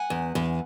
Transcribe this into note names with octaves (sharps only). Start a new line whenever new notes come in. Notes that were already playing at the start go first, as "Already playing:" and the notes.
Already playing: F#5 G#5
E2
E2